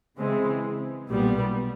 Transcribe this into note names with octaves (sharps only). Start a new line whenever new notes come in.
C#3 E3 G#3 C4
B1 A#2 G3 B3